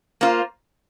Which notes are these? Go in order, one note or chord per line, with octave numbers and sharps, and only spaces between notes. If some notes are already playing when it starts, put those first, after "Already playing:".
A#3 F4 C5